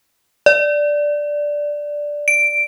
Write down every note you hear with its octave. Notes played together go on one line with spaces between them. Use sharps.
D5
D7